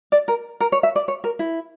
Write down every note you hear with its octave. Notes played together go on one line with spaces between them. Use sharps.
D5
A#4
A#4
C#5
E5
D5
C#5
A#4
E4